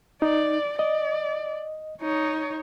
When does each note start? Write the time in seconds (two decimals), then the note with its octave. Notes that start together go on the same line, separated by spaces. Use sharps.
0.22 D#4 D5
0.79 D5 D#5
2.01 D#4 C#5